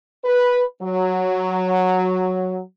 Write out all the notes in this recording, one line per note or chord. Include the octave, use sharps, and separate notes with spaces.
B4
F#3